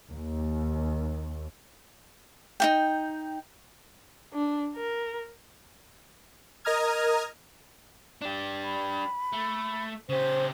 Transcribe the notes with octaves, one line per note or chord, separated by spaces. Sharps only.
D#2
D#4 F4 G5
D4
A#4
A#4 D#5 A#5 D#6 F6 G#6
D4 G4
B5
A3
C#3 G4 C5